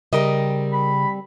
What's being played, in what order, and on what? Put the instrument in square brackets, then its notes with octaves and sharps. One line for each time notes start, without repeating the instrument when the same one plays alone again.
[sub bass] C#3 [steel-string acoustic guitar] G3 C4 [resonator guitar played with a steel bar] A#4 D#5
[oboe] B5